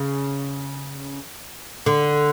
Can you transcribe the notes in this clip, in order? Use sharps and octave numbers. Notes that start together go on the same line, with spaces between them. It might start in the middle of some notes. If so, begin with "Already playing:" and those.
Already playing: C#3
D3